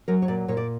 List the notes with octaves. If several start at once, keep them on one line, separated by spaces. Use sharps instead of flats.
F#3 A#4
C#5
A#2 D5
A#2 C#5
D5